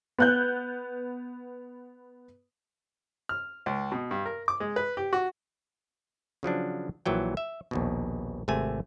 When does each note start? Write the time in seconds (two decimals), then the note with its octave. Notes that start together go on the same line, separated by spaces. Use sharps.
0.19 B3 F#6 G6
3.29 F6
3.66 C#2
3.92 B2
4.11 G2
4.26 A#4
4.48 D6
4.60 G#3
4.76 B4
4.97 G4
5.13 F#4
6.43 C#3 F3 F#3 D4
7.06 A#1 A#2 E3 F#3 G5
7.37 E5
7.71 A#1 D#2 B2
8.48 G#1 C3 A3 G#5